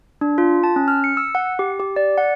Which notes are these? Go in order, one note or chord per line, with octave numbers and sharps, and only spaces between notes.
D4
F4
A5
C#4
F6
C#7
E6
F#5
G4
G4
D5
F#5